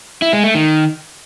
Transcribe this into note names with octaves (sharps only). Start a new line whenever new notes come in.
E4
G#3
A3
D#3